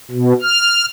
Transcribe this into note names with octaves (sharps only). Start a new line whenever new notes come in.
B2
F6